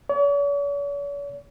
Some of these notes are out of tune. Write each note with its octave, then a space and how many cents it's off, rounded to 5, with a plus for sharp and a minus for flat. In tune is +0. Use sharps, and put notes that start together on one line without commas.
C#5 +45